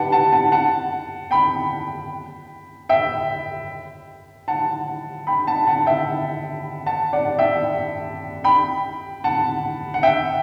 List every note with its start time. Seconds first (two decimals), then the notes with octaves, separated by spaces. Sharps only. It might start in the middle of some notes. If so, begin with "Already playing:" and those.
Already playing: G4 B4 F#5 G5 A5
0.12 F#5 A5
0.33 F#5 A5
0.52 F#5 A5
1.31 G5 B5
2.89 E5 G5
4.48 F#5 A5
5.27 G5 B5
5.47 F#5 A5
5.67 F#5 A5
5.86 E5 G5
6.86 F#5 A5
7.13 D5 F#5
7.39 E5 G5
8.44 G5 B5
9.24 F#5 A5
9.94 F#5
10.03 E5 G5